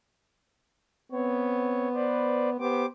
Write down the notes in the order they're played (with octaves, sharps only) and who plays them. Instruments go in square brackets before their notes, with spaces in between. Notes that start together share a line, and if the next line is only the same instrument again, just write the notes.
[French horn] B3 [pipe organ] C4 C#5
[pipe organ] B4 C5 D5
[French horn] B3 [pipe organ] G4 C5 D6